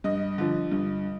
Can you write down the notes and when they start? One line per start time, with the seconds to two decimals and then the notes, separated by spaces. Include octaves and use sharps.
0.04 G2 D#5
0.38 D3 F3
0.71 G2